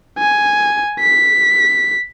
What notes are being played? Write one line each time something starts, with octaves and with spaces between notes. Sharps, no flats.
G#5
B6